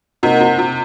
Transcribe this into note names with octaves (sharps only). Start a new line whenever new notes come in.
C3 A#3 D#4 A#4 D#5 F#5
C3
C3